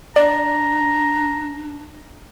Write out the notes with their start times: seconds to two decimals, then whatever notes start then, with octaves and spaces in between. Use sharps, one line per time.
0.16 D4 D5 A#5